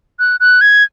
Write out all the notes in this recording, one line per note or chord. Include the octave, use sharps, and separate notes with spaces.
F#6
F#6
G#6